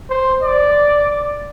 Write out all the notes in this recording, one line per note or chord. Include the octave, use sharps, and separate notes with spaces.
C5
D5